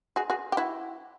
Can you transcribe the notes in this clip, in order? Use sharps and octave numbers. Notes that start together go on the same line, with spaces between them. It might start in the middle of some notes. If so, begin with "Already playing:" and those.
F#4 G#4
F#4 G#4
G4
E4 F#4